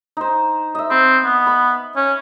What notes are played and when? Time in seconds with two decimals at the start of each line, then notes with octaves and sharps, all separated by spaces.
0.17 D#4 C5
0.75 D#5 E5
0.90 C4 B5
1.24 B3
1.47 B5
1.96 C#4